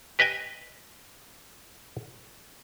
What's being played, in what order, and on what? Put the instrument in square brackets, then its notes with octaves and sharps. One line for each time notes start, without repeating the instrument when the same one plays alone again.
[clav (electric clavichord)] G4 B4 D#5 G5 G#5